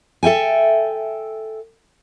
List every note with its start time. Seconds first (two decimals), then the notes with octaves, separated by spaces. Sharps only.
0.23 A4 E5 G5 G#5